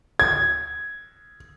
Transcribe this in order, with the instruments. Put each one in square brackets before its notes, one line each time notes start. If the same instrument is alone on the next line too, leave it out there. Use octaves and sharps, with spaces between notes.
[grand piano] G#6